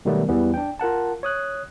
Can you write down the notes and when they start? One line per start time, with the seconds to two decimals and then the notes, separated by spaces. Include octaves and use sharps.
0.05 B2 D#3 F#3 G3 A3 B3
0.29 E2 E3 G3 B3
0.54 D4 G5
0.79 F4 A#4 F#5 A5
1.23 C#5 D#6 F#6